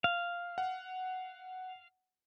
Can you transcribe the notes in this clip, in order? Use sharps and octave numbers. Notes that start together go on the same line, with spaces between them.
F5
F#5